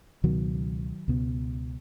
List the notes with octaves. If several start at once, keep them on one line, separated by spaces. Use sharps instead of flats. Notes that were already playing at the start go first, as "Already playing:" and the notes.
C#2 B2 D#3 F#3
C#2 B2